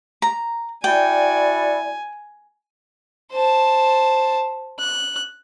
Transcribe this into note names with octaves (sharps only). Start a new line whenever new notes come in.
A#5
E4 F#4 D5 G5 G#5
C5 A5
F#6